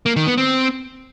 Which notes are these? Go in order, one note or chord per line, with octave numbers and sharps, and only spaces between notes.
A#3
D#3
B3
C4